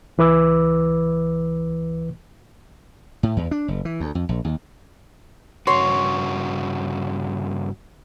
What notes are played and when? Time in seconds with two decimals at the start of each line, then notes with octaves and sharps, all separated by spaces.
0.18 C#2 E3 B4 D6 E6
3.23 A2
3.37 E2
3.51 D4
3.68 F#1
3.85 E3
4.00 D2
4.15 F2
4.29 A#1
4.45 D#2
5.67 G2 C#3 F#4 C#5 C6